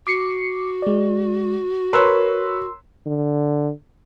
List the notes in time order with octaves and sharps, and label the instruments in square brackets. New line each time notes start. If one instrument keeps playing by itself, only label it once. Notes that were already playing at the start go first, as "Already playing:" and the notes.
[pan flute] F#4 [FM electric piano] D6 C7 C#7
[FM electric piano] G#3 D5
[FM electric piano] A#4 C6 E6 [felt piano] B4 C#5
[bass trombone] D3